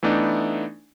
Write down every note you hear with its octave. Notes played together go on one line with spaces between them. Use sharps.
E3 A3 B3 D4 D#4